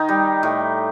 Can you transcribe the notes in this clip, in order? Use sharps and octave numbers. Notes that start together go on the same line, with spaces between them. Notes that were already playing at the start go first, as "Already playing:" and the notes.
Already playing: D#3 D#4
G3
A2